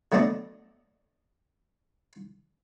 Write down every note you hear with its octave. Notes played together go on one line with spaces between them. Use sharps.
F#3 A3 B3 D4 D5 D#5